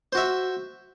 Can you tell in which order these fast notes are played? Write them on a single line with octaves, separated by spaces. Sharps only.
C5 F#4 E5